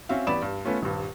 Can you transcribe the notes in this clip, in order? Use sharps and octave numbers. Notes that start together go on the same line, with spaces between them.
C4 C#4 F#4 E5 F5
A1 B3 G4 D5 B5 E7
G2
A3 B3 C#4 F4
D#1 G2